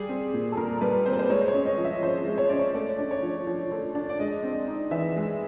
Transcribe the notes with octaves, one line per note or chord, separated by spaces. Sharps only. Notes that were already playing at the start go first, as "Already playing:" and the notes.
Already playing: G3 G#4
C4
A#2
A4
A#2 A#4
G3 B4
C4 C5
B4
C5
G#3 C#5
C5
C#5
C#4
D#5
F3
E5
F3 C5
G#3
C#5
C#4 D5
C#5
A3 D5
D4
C#5
F3
F3
A3
D4
D5
G#3 D#5
C4
D#4
E3 E5
G#3